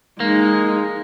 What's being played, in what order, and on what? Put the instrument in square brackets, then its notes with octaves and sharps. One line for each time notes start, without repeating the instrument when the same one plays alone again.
[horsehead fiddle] G#3 D#4 [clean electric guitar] A#3